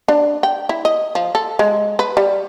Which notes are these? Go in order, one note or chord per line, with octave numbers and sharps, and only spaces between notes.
D4
G5
E4
D#5
F3
A4
G#3
B4
G3